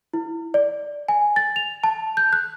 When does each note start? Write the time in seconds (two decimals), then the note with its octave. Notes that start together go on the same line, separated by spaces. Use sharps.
0.13 E4
0.54 D5
1.08 G#5
1.36 A6
1.56 F7
1.84 A5
2.17 G6
2.33 F#6